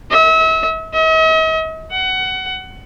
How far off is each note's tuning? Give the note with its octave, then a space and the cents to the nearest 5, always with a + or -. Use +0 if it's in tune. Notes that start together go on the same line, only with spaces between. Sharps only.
E5 -35
D#5 +45
F#5 +20